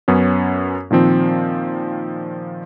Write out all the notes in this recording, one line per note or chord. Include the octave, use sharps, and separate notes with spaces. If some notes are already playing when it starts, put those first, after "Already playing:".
F#2 B3 C#4
A#2 D#3 F3 C4